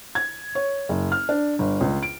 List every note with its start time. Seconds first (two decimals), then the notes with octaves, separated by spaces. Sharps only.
0.15 G#6
0.55 C#5
0.89 F#1
1.12 F6
1.29 D4
1.59 G1
1.81 C#2
2.03 D7